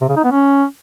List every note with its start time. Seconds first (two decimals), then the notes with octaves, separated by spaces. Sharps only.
0.01 C3
0.09 C#3
0.16 D#4
0.24 B3
0.31 C#4